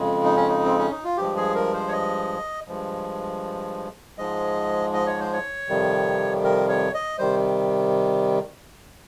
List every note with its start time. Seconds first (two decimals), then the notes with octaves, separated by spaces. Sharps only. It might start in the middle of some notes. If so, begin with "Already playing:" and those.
Already playing: F2 C#3 G#3
0.24 D#4
0.36 C#4
0.48 D#4
0.64 C4
0.78 C#4
0.91 D#4
1.04 F4
1.17 G2 F3 G#3 G4
1.37 G#4
1.55 A#4
1.74 C5
1.88 C#5
1.92 D#5
2.68 G2 F3 G#3
4.18 G#2 F3 G#3 D#5
4.94 D#5
5.06 C#5
5.20 C5
5.33 C#5
5.69 F2 C3 D#3 G3
6.44 A#4
6.69 C#5
6.94 D#5
7.19 C3 D#3 G3 C5